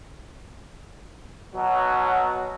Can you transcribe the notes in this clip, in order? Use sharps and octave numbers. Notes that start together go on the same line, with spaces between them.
B2 F#3